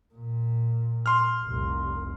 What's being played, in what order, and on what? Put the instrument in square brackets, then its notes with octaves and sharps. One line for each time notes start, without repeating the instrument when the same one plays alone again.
[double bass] A#2
[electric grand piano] C6 F6
[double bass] F1 C2